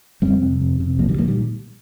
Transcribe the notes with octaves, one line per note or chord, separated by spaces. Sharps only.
F2 G3 C4
C3
F2
C3
C2 F3 A#3
D#3 G3
A#2 F3 A#3
D#3 G3